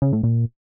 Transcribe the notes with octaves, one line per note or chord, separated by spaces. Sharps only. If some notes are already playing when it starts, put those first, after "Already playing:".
C#3
A2
A#2